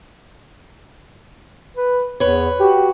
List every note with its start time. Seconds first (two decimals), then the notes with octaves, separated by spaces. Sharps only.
1.76 B4
2.20 E2 B4 C#5
2.60 F#4 G4